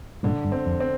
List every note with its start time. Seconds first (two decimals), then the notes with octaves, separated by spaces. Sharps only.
0.23 G2 A#2 D3
0.45 G2
0.52 C4
0.66 F2
0.80 C4